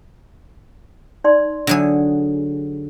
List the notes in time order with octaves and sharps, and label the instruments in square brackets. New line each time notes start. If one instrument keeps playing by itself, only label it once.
[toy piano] D#4 D5 C6
[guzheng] D3 F#3 G#4